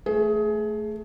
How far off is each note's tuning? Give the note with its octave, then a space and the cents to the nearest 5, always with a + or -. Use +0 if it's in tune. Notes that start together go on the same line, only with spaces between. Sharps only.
A3 +0 G#4 +20